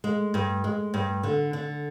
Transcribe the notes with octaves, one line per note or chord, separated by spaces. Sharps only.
G#3
G2
G#3
G2
D3
D3